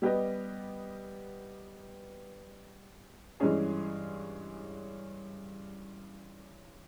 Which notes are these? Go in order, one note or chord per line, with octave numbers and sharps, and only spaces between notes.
G3 B3 G4 B4 D#5
G2 E3 G#3 C#4 G#4